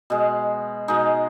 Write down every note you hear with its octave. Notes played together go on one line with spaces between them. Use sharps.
B2 G#3
B2 G#3 D#4